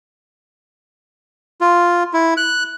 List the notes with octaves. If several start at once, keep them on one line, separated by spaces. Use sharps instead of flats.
F4
E4
F#6